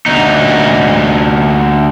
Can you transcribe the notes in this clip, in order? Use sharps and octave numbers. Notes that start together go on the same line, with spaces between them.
D2 D#4